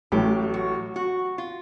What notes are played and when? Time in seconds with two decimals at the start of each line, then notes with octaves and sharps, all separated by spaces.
0.12 A1 A2 F#3 G4
0.54 F#4
0.96 F#4
1.38 F4